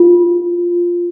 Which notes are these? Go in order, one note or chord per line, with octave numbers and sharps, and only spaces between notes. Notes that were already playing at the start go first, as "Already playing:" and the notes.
Already playing: F4